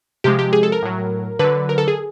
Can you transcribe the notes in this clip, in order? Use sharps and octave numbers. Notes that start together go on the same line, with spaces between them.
C3 F3 G#3 G4
G4
G#4
A4
A#4
A2 F#3
D3 F#3 B4
A#4
A4
G#4